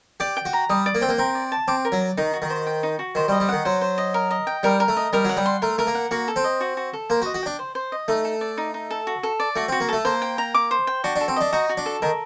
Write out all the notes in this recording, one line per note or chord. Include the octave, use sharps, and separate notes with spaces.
G4 D5
G5
F#4
A#5
G3 D#6
D5
A#3
C4 G5
A#3
C4 A#4
D5
A5
C4 D6
A#4
F#3
D5
D#3 D#4
F#4
D#3
C5
G5
D#4
F#4
D#3 C5
G3
D#5
G3
D#3 F#5
F#3 C5
C5
D#5
A#4
D#5
G5
G3 A#4
A#4
A3
D#5
G3 A#4
F#3 F#5
G3
C6
A3 A#4
A3 A#4
A#3
F#5
A#3 F#4
A4
C4
D#5
F#4
F#4
A4
A#3 C5
F#4
D#5
F#4
D4 G5
C5
C5
D#5
A3 D#4
A4
D5
D#4
D#4
A4
F#4
A4
D5
A3 F#4
C4
F#4
A#3
A3 A4
A#3 C5
G5
A#5
D6
C5
G5
D4 F#4
D4
A4
C4
D4 D#5
D#4 F#4
F#4
D4
A4
D#3 A#4